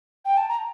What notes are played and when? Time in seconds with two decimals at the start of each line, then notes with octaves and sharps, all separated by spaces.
0.25 G5
0.37 A5
0.49 A#5